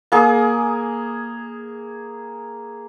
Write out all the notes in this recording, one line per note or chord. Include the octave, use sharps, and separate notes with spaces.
A#3 G#4 D#6